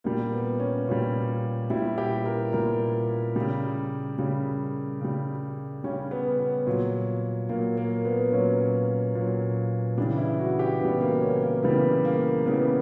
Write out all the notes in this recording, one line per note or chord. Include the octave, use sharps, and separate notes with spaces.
A#2 G3 A#3
B3
C#4
A#2 G3 C#4
A#2 G3 E4
G4
A#4
A#2 G3 A#4
C#3 G3
C#3 G3
C#3 G3
C#3 G3 C#4
B3
B3
A#2 F#3
A#2 F#3 A#3
A#3
B3
A#2 F#3 C#4
A#2 F#3
C#3 E3 G3 D4
E4
F#4
G4
C#3 E3 G3 B3
A#3
C#4
A#3
C#3 E3 G3 B3
A#3
C#3 E3 G3 B3
A#3
B3